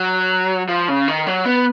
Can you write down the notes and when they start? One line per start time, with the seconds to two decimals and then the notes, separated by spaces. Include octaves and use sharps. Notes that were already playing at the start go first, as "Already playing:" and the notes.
Already playing: F#3
0.69 F3
0.88 C#3
1.08 D#3
1.27 F#3
1.46 B3